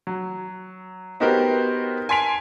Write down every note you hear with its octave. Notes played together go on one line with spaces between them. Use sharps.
F#3
B3 D#4 F#4 G4 A#4 C5
G#5 A5 C6 B6 D7 F7